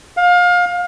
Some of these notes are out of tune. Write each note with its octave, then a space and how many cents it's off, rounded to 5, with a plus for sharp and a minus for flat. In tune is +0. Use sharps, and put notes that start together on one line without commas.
F5 +25